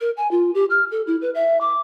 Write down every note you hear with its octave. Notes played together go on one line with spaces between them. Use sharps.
A#4
G#5
F4
G4
F6
A4
E4
B4
E5
D6